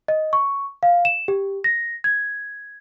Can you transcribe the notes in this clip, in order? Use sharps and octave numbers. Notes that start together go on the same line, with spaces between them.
D#5
C#6
F5
E7
G4
A#6
G#6